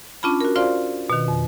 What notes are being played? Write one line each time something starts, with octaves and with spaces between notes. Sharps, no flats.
C#4 D4 F4 A5 B5
F#4 A#4
F4 F#4 C5 D5 F5 C6
B2 D#3
F2